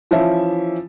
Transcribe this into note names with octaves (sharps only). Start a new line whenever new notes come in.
E3 F3 C#4 E5